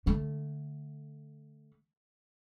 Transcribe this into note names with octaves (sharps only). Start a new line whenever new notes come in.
D3 A3